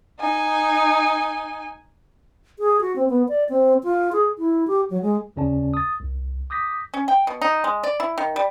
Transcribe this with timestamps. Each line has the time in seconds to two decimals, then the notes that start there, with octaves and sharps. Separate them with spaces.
0.19 D#4 G#5
2.59 G#4
2.81 F#4
2.96 C4
3.10 B3
3.28 D5
3.49 C4
3.84 F4
4.13 G#4
4.38 E4
4.67 G4
4.90 F#3
5.02 G#3
5.36 D#2 C#3 C#4 D5 A5
5.74 D#6 A6
6.00 C2
6.50 D6 D#6 G6 A#6 B6
6.94 C#4
7.08 G5
7.27 B2
7.42 D#4
7.64 G#3
7.83 D5
8.00 E4
8.18 D#3
8.36 G3